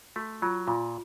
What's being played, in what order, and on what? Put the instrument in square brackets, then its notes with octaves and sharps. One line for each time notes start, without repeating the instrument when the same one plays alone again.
[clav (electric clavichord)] A3 [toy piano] F#4
[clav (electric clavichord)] F#3 [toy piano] F4
[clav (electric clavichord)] A#2 [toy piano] F4